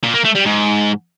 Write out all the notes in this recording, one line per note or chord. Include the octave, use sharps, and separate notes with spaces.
A#2
A#3
A3
G3
G#2